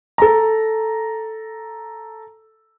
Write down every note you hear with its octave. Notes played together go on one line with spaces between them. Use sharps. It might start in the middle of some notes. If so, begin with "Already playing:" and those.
A4 A#5